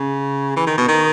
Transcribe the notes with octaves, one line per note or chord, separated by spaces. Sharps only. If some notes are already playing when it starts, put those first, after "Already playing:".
Already playing: C#3
E3
D#3
B2
D#3